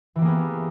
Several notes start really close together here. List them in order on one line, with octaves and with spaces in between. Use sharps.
E3 G4 A#3 G#4 B3